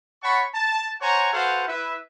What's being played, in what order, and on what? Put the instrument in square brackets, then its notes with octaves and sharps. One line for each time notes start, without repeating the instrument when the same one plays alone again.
[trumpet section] C#5 F#5 A5 B5 C#6
A5
C5 C#5 F#5 G#5 A#5 C#6
F#4 A4 B4 C5 F5 F#5
E4 B4 E5